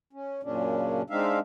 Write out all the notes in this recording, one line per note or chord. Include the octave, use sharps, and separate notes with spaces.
C#4
F#2 A#2 C#3 C#4 D4
G#3 C4 D4 D#4 E5 F5